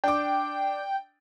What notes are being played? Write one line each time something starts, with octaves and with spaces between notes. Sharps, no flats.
D4 G5 D6